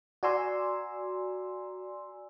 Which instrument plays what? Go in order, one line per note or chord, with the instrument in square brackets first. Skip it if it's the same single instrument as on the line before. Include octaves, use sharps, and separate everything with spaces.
[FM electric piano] F#4 D5 G#5 A#5 C6 E6